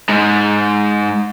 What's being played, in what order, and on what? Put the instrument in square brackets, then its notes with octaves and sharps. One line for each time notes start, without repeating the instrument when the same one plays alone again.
[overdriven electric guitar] G#2 G#3